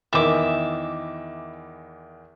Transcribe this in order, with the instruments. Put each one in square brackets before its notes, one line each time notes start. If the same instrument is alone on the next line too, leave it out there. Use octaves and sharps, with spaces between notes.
[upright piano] E2 D#3 E3 [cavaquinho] E5 D6